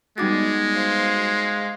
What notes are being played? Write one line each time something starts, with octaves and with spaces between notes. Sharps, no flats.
G3 G#3 B3 D#4 F#4 D6 A6
C5 F5